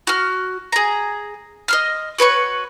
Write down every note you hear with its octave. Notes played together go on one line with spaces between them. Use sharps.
F#4 F6
G#4 A#5
D#5 C6 F6
F#4 B4 C#5 C#6